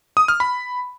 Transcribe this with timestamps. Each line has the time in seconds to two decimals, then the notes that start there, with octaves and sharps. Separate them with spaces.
0.17 D#6
0.28 F6
0.40 B5